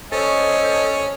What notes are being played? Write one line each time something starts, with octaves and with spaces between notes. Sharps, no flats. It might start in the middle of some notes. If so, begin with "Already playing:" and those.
C#4 A4 C5 D#5